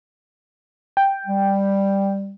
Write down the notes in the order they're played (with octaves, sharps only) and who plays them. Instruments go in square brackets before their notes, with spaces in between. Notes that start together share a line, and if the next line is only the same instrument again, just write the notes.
[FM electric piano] G5
[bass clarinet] G3